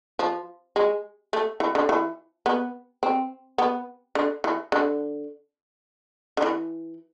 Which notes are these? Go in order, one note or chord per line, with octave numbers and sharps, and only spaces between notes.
F3
G#3
A3
E3
D3
E3
B3
C4
B3
D3
E3
D3
D3
E3